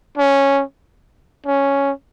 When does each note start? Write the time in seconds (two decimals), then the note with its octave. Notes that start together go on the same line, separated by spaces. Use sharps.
0.17 C#4
1.46 C#4